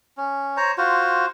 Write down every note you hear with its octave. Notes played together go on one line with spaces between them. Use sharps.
C#4
C5 C#5 A#5
F4 F#4 C5